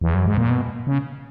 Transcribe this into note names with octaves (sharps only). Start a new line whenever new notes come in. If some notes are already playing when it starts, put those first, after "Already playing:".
E2
F#2
G#2
A#2
B2
C#3